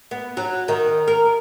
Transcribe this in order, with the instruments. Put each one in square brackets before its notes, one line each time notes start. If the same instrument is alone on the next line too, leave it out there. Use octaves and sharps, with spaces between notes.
[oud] B3
F#3
D#3
A#4